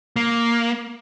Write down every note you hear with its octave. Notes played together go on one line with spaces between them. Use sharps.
A#3